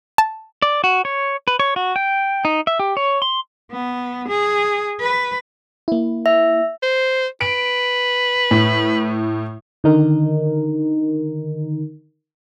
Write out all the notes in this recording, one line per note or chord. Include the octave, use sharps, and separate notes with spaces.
A5
D5
F#4
C#5
B4
C#5
F#4
G5
D#4
E5
G4
C#5
C6
B3
G#4
B4
A#3 E4
E5
C5
B4 D7
A2
D3 D#3 D#4 A#4